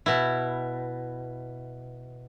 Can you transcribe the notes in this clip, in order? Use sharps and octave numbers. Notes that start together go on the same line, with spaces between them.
B2 E4